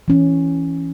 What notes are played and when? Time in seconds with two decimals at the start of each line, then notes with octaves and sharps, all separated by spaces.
0.08 E3 C#4